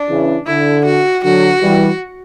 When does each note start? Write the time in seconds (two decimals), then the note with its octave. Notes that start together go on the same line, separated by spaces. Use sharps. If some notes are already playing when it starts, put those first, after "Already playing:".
Already playing: D4
0.09 C#3 E3
0.47 D3 E4
0.85 F#4
1.24 D3 F#3 F#4
1.62 E3 G3